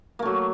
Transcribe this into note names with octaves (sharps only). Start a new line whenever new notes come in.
F#3 A3 A#3